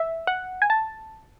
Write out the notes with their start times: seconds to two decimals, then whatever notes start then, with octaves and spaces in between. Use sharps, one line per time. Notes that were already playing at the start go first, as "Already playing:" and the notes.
Already playing: E5
0.27 F#5
0.62 G#5
0.70 A5